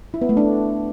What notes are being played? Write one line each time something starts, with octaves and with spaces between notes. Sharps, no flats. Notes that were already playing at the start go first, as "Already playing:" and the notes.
E4
B3
A3
D4